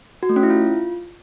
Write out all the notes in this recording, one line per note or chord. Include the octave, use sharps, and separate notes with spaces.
F#4
A3
C#4
E4
F4